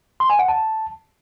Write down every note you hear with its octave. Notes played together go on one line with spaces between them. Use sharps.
C6
G#5
F#5
A5